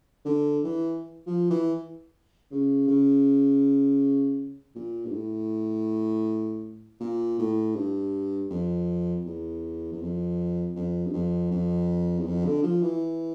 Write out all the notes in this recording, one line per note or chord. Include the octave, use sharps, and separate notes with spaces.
D3
E3
F3
E3
C#3
C#3
A#2
G2
A2
A#2
A2
G2
F2
E2
E2
F2
F2
G2
F2
F2
E2
F2
D3
F3
E3